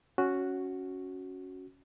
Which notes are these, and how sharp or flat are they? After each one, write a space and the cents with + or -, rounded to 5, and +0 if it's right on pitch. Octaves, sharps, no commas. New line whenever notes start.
C#4 +0 F#4 +0